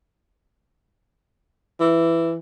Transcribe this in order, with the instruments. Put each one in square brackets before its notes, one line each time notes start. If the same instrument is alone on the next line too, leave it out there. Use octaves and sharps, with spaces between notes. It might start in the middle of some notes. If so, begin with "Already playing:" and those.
[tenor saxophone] E3